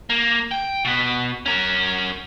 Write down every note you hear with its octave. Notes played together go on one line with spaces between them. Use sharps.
A#3
G5
B2 B3
C#4 A#4